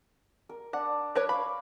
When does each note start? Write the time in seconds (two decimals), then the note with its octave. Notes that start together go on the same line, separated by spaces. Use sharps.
0.49 A#4
0.73 D4 F#5
1.15 A#4 B4 C#5
1.29 C#5 F5 B5 D6